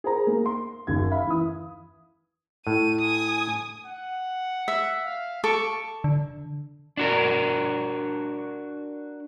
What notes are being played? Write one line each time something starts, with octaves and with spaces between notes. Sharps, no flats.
G#4 A#4 C5 A#5
A#3
C6
F#1 D#2 G#6
E5 F5 B5
E3 D#6
A2 D#7
G#5 D#6
F#5
E5
F5
A4 C#6 D6
D3
D4 F#4 A#4